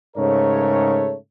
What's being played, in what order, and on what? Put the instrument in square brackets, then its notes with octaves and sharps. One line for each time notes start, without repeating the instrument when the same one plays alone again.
[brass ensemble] G#2 C#3 A3 A#4 C#5